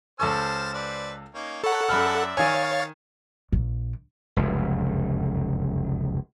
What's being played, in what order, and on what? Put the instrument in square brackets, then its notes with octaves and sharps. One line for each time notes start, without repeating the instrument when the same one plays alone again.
[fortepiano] C#2 A4 C#6 [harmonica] C5 A5 F6
[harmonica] B4 C5 D5
A#3 C#4 D#4
[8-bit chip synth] A4 F#5 [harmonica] A#4 C#5 B5
[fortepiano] F#2 B5 F6 [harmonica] D5 E5
[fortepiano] D#3 G#5 [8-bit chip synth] C#5 F5 A6
[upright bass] A#1
[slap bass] F1 C#2 F#2